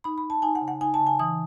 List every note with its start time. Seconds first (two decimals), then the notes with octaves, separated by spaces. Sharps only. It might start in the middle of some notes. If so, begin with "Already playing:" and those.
0.04 D#4 B5
0.18 B5
0.24 D#4
0.30 A5
0.42 D#4 G#5
0.55 F#5
0.61 C#3
0.68 F#5
0.81 D#4 G#5
0.94 A5
1.00 C#3
1.07 G#5
1.19 E3 D#6